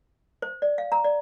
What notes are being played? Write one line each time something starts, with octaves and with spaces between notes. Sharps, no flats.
C5
D5
F5
A#5
D5